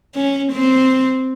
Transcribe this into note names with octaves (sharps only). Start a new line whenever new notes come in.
C#4
C4